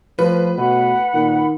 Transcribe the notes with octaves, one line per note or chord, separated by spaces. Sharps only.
A2 F3 B4
B2 F#5 B5
A#2 D#3